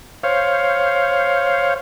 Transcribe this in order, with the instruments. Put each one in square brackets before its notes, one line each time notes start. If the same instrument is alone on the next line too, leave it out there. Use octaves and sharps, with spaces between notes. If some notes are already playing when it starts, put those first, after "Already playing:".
[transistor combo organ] C5 C#5 F5